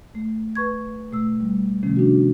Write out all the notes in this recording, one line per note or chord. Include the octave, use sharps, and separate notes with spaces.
A3
B4 C#6 G#6
B2 A3 E6
G3
C3 D#3 F3 A3 C#4
D4 F#4